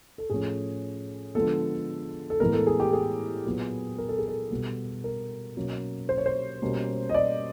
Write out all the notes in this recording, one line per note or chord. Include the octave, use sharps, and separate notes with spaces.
A4
A2 F3 A3 C#4 G#4
D3 F3 G#3 B3 A4
A4
A2 E3 G#3 B3 A#4
A4
G#4
G4
G#4
A#2 F#3 B3
A#4
A4
G#4
A4
B2 G3 B3
A#4
B2 F#3 A#3 C#4
C5
C#5
C5
B2 G3 A#3 C#4
D#5
D5